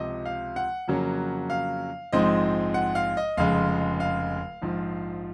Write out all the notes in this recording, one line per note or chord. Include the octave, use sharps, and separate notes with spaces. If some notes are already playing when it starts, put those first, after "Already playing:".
Already playing: C#2 C3 F3 D#5
F5
F#5
F2 C#3 F#3 A#3 C#4
F5
A#1 G#2 F3 G#3 C4 D#5
F#5
F5
D#5
F1 F2 C#3 G#3 F5
F5
A#1 G#2 F3